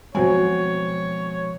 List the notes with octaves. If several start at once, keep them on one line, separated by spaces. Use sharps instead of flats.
B2 F3 F#3 G#3 C4 C#5 G#5